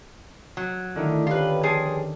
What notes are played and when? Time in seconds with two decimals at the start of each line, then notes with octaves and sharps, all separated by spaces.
0.57 F#3
0.96 D3 D#3 A3 E4
1.27 B3 C#4 F4 G4 B4
1.63 F3 G#4